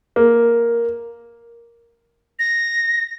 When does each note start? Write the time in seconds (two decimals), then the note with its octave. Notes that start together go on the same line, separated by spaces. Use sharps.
0.16 A#3
2.39 A#6